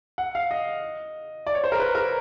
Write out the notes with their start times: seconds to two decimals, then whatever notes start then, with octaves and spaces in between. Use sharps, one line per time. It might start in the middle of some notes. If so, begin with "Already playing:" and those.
0.18 F#5
0.35 F5
0.51 D#5
1.47 D5
1.55 C#5
1.64 C5
1.72 A#4
1.80 B4
1.95 A#4